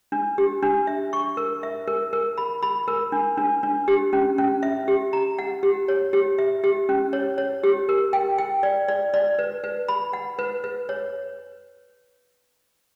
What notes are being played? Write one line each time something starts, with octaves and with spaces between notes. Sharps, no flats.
D4
G4
D4
E5
C#6
A#4
E5
A#4
A#4
B5
B5
A#4
D4
D4
D4
G4
C#4
C#4
E5
G4
A#5
F#5
G4
C#5
G4
E5
G4
C#4
C#5
C#5
G4
A#4
G5
G5
D5
D5
D5
B4
B4
B5
F#5
B4
B4
C#5